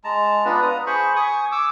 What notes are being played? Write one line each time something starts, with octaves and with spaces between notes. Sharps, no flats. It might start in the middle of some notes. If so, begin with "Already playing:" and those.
G#3 A5 A#5
B3 D4 F4 B4
A#5 D#6
G#4 C5 B5 C#6
G#5 C#6 D#6
D6 E6